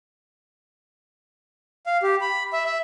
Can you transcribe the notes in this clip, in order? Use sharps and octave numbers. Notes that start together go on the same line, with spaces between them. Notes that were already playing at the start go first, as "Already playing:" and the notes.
F5
G4
B5
E5
E5